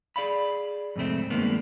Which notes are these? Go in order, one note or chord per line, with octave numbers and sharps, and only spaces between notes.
G#4 D5 F5 B5
F2 G#2 C3 A3 C4
G2 D#3 G#3 A#3 B3